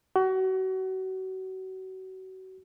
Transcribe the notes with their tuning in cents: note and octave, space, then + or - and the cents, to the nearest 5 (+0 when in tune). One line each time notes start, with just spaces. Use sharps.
F#4 +30